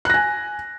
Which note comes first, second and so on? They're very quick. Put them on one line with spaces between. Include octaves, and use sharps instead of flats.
F#6 A#6 G#5